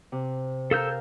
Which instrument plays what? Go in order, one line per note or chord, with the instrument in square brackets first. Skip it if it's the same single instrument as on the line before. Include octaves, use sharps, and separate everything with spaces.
[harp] C3
[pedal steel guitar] A4 E6 G6 [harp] A#4 F5